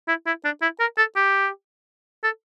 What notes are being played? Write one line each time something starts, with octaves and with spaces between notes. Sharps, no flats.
E4
E4
D4
E4
A#4
A4
G4
A4